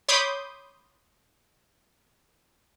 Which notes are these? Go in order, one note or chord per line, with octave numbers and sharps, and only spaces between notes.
C#5 B5 C6 D6 D#6 G6